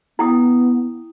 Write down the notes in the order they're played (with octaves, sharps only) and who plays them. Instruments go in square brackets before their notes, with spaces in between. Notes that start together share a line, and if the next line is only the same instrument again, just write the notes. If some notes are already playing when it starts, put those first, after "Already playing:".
[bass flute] B3 [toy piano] E4 G5 D#6